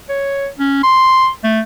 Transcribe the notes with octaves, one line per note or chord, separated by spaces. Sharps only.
C#5
C#4
C6
A3